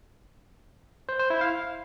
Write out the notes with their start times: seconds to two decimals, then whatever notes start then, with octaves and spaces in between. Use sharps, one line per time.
1.09 C5
1.19 C5
1.30 E4
1.41 F5